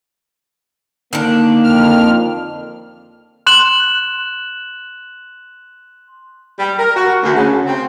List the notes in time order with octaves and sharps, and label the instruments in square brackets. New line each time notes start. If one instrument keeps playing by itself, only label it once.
[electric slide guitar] D3 [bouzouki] D#3 D4 [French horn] A#3
[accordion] F2 F6
[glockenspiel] C6 F#6 E7 F#7
[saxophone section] G3
A#4
F#4
D2
C#3
C4